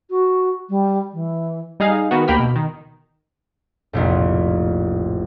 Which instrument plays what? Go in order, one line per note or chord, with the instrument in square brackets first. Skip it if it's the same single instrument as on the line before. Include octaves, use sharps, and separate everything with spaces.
[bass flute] F#4
G3
E3
[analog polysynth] G3 D#4 G#4 F5
D#3 B3 F#4
D2 A#3 G4 G5 B5 F6
B2
D#3
[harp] F1 A#1 A2